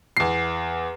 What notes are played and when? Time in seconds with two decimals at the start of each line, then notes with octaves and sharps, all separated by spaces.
0.17 E2 C7